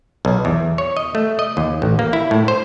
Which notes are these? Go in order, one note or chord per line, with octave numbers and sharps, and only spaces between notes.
B1
E2
C#5
D#5
A3
D#5
D#2
A1
A#3
E4
A2
C5